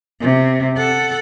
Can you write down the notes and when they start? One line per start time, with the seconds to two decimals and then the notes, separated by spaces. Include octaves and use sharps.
0.20 C3
0.77 A4 F#5